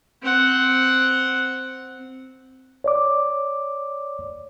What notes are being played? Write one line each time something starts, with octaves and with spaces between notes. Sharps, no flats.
C4 F#5
C#5 D5 D6